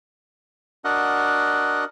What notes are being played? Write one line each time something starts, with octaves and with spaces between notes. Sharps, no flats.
D4 F#4 A#4 D#5 F#5